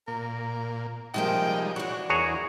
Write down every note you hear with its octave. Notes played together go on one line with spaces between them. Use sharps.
A#2 A#4
C3 F3 G3 G#3 A#3 D#4 G5
E3 D4 F#4 C#5 F#5
E2 F#4 G#4 A#4 C#5